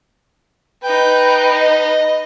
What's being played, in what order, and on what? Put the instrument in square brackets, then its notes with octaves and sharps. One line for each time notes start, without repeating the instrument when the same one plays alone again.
[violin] D#4 B4 [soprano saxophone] G5
[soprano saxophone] D#5